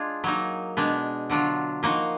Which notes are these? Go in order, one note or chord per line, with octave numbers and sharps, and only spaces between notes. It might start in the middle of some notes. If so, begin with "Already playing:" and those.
Already playing: G#3 D4 F4 G#4
F#3 A#3 D#4
B2 G#3 D4
D3 F#3 D4 F4
F3 A#3 D#4 F#4